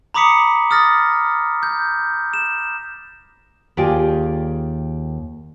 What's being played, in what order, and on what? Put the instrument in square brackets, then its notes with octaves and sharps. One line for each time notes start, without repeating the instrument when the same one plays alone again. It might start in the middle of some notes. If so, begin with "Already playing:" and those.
[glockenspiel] A#5 B5 D6 D#6 B6 C#7
D#6 F6 A6 A#6
G6
E7
[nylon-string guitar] D#2 F4 G4 G#4 D5